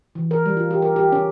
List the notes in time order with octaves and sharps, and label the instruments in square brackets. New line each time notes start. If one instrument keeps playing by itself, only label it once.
[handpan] E3
A#4
G3
F4
G4
A#4
G4
C#4